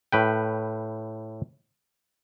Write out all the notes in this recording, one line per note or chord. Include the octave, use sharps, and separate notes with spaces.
A2 B4 G5